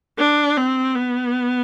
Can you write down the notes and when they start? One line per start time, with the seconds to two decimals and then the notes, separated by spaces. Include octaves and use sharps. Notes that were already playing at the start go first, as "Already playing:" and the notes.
0.18 D4
0.57 C4
0.95 B3